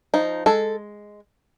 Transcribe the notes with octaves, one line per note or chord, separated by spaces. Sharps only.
F3 D#4
G#3 A4